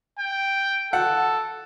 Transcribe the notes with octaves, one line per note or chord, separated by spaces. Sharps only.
G5
A4 F#5